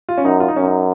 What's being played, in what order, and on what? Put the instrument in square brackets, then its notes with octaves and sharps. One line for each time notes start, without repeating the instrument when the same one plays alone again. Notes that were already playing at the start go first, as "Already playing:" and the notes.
[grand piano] F4
C#4
[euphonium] F#2 [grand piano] D#4
[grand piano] F4
D#4
[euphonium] F#2 [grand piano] C#4
[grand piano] D#4